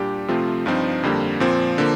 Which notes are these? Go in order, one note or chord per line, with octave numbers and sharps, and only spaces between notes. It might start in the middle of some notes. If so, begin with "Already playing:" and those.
Already playing: A#2 G3 D4 G4
C3 F3 A3 C4 F4
G2 F3 C4 D#4
F2 D3 G3 A#3
A#2 F3 C4
D3 F3 A#3